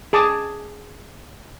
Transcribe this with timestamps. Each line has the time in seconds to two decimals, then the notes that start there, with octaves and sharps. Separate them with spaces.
0.13 G#4 A5 D6 D#6